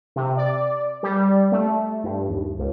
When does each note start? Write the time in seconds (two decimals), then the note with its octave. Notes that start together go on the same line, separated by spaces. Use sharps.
0.16 C3
0.37 D5
1.03 G3
1.52 A3
2.04 G2
2.29 D#2
2.58 C#2